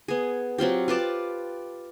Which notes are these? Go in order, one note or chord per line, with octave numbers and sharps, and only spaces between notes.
B3 G#4
F#3 C4 F4 G4
F4 B4 D5 A5